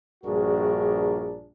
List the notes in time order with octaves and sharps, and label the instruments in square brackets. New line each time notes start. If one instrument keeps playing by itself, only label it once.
[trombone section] A#1 G2 D4 F#4 G#4 A#4